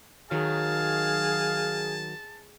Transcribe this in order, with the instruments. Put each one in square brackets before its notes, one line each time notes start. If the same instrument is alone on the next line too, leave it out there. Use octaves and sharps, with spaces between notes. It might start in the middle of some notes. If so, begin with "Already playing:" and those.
[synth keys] D#3 F#3 [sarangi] G#4 [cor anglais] F5 [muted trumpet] A5